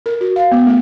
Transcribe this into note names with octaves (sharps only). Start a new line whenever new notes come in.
A#4
F#4
F5
B3
A3